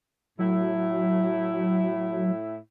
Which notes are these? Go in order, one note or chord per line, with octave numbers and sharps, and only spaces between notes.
A2 F#3 E4